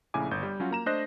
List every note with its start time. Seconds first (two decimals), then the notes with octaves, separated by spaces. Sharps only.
0.14 A#1 C#3 A3 E4 G#5 D6
0.31 G1 G6
0.43 G3
0.60 F#3 C#4 F4 F#4
0.71 A#3 A#5 E7
0.86 A3 D4 C5 D#5 F#6 A#6